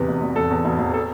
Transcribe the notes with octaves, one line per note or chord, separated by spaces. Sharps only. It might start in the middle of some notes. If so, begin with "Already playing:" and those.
Already playing: E2 C3 B4
E1
E1
E1 A4
E2
E1
E1
A4